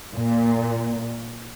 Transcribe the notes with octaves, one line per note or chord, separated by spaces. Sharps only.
A#2